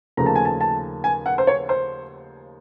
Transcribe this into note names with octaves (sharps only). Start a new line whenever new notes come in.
D#2 C#3 F3 A3 A#5
A5
G#5
A5
A5
G#5
F#5
C5
C#5
C5